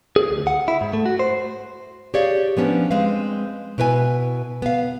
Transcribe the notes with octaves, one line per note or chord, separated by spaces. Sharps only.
G#4
D2
F#5
E4
G#2
A3
F#4
C5
G4 G#4 C#5 D5 F5
F3 B3 C#4 D4
G#3 C4 B4 F5
B2 E4 B4 D#5 G#5
B3 F5